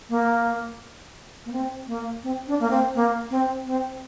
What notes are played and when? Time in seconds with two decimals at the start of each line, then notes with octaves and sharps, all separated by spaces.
0.09 A#3
1.45 A#3
1.52 C4
1.87 A#3
2.23 C4
2.47 D4
2.60 A#3
2.70 C4
2.94 A#3
3.30 C4
3.66 C4